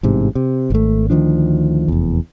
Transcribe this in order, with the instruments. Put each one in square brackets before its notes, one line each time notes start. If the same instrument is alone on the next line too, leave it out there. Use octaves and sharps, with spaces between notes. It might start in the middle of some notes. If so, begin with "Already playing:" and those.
[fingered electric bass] A1 G#2 C3
C3
G#1 A3
D2 D#3 F3 D4
F1 E2